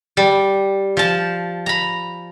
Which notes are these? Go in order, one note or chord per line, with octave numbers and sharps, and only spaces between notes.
G3
F3 A5
A#5 B5